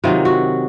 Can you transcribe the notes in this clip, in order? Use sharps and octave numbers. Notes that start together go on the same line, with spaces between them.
C3 D#3 F#3 F4
F#4